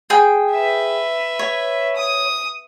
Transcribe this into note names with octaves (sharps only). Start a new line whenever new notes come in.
G#4 G5
B4 E5
C#5
D#6